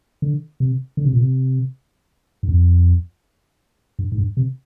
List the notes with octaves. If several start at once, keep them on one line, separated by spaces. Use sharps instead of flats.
D3
C3
D3
C3
A#2
C3
G2
F2
G2
G#2
G2
C3